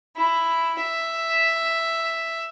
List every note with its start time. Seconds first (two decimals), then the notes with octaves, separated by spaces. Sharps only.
0.17 E4
0.81 E5